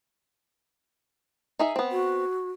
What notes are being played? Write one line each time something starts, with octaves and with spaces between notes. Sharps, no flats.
D#4 G#4 E5
B3 C4
F#4